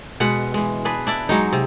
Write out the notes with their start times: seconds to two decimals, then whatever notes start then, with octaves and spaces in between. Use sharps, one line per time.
0.20 B2 G#3 B4 F#5
0.54 E3 G#3
0.85 D4 G#4 B4
1.07 D4 E4 D5
1.29 F#3 G#3 D#4
1.53 C3